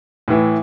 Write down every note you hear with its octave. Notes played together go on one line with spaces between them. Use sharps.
A2 E3